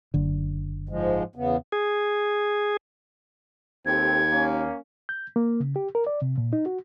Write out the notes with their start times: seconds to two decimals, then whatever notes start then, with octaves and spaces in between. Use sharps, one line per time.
0.14 F#1 D3
0.89 G#2 F3 G#3
1.36 E2 C#3 B3
1.72 G#4
3.86 D#2 C4 G4 A4 G#6
4.33 A#3 C#4
5.09 G6
5.36 A#3
5.60 C#3
5.76 G4
5.95 A#4
6.07 D5
6.22 C3
6.38 A#2
6.53 D#4
6.66 F#4